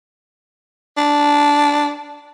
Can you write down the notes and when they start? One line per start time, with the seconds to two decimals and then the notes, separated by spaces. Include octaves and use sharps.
0.97 D4